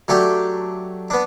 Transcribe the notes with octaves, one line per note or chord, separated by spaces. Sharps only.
F#3 A3 D4 G4
B3 D4